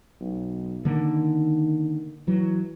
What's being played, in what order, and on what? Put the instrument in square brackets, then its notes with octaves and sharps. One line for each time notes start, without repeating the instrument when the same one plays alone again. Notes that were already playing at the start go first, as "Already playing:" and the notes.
[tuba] B1
[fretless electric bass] D3 A#3 [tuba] D#3
[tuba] E3 [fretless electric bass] F#3